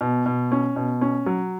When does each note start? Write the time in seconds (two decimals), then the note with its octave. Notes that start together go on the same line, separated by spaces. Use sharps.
0.01 B2
0.26 B2
0.52 C#4
0.76 B2
1.01 C#4
1.26 F#3